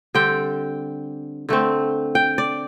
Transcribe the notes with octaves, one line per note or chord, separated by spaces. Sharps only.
D3 G3 C4 G5
D3 A3 C4
G5
D5